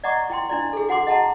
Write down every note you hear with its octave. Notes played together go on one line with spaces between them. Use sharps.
D5 D#5 F#5 A#5 C#6 D6
E4 G5 C6
D4 E4 D5
G#4 A4
F#4 F#5 C6 D6
D#5 F#5 A5 A#5